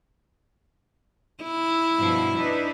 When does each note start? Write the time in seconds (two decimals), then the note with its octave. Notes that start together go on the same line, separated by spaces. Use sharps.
1.43 E4
1.99 G2 B2 F3
2.36 D4 D#4 B4